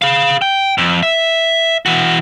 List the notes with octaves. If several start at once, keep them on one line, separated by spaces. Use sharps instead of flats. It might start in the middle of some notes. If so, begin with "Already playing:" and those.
G#4 F5
G5
F2
E5
E3 F#4